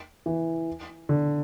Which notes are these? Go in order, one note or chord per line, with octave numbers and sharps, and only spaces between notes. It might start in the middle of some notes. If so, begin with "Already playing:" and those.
E3
D3